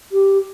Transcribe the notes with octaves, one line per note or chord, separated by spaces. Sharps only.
G4